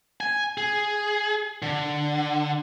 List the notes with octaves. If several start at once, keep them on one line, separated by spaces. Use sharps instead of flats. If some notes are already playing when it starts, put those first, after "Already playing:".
G#5
G#4
D3